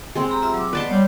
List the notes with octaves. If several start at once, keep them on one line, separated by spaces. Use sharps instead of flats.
G#3 C4
G4 A#5 B5
F4 E5 E6
F#3 D6
B3 B4 D5 D#5 A5 C6
G3 C#5